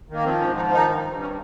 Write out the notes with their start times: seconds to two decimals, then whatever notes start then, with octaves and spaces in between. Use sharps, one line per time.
0.09 D#3 A#3
0.24 F3 C4
0.40 G#2 C#4
0.56 F3 D#4
0.72 D#3 D#4
0.89 G2
1.05 G2
1.21 C#4